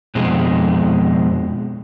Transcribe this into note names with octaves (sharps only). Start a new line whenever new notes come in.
F2 B2 G#3 C4